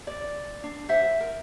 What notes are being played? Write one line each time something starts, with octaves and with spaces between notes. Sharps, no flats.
D5
D4
C5 E5 F#5
A#4